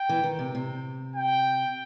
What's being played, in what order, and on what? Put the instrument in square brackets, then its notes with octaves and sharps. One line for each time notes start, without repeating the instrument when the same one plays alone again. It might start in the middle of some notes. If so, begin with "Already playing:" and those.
Already playing: [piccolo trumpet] G5
[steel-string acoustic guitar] E3
D#3
C3
C3
[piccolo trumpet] G5